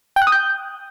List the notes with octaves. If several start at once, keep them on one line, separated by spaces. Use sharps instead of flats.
G5
F#6
D#6
G6